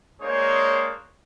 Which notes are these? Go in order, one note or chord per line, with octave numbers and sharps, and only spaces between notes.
G#3 A#3 D4 G#4 C5 C#5